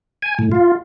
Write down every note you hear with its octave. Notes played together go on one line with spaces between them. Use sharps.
G#5
A2
F4